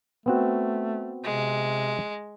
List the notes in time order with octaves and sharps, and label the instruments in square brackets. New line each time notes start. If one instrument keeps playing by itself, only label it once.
[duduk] A3 [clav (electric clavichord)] B3 C4 F#4
[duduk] C3 [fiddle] G#3